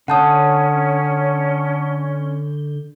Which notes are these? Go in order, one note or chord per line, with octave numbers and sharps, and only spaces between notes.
D3 C#4 F#5 A5 D#6 G6